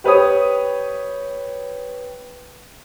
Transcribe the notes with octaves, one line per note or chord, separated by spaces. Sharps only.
G4 B4 C#5 D#6